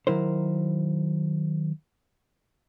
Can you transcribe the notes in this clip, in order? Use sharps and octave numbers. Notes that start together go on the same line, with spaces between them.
D#3 F#3 E4 A#4 C5